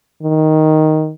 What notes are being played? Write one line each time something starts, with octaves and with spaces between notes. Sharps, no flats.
D#3